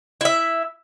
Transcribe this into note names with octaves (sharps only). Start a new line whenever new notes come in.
E4 E5